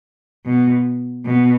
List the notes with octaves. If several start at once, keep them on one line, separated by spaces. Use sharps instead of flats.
B2
B2